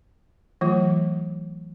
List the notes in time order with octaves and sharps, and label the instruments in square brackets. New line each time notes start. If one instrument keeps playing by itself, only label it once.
[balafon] E3 F#3 A3 F4